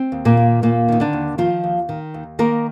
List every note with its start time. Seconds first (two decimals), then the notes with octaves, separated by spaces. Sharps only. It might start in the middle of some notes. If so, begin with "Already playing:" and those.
Already playing: C4
0.12 D#2
0.25 A#2 A#3
0.37 D#3
0.62 D#2 A#2 A#3
0.88 D#3 D#4
1.00 D3 D4
1.13 D#2
1.38 D#3 F3 F4
1.64 D#2
1.89 D#3
2.14 D#2
2.39 D#3 A#3 A#4